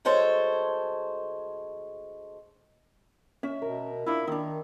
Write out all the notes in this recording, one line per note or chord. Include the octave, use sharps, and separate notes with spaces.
D2 G#3 A4 C5 C#5 A5
C#4 E5
B2 A#4
D4 E4 F4
D#3 D4 D#4